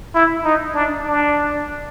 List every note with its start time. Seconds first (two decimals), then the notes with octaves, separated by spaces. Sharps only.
0.15 E4
0.45 D#4
0.75 D4
1.06 D4